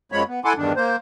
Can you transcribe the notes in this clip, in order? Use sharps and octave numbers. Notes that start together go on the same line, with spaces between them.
F#2 F3 G#3 C#5 B5
B3
E4 A4 F#5 G#5 C6 D6
E2 G2 D#3 D4
A#3 C5